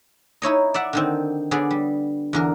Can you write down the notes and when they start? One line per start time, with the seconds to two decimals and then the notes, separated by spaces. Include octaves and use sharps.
0.42 D#4 E4 C#5 D#5
0.74 D5 E5 F#5
0.93 D3 D#3 C4
1.51 D3 B3 G#4 D5
1.71 G3
2.33 E2 D3 A#4